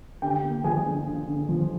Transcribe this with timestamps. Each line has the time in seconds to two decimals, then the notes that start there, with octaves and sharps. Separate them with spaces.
0.22 D3 G4 G5
0.43 A#3
0.64 F3 G#4 G#5
0.86 D3
1.07 D3
1.28 D3
1.49 F3